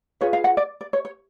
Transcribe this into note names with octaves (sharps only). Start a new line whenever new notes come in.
F4 G#4 B4 C#5
F5
F#5
D5
D5
C#5
C#5